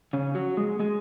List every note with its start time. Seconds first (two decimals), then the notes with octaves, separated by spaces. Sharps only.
0.13 C#3 C#4
0.35 F#3 F#4
0.57 G#3 G#4
0.79 G#3 G#4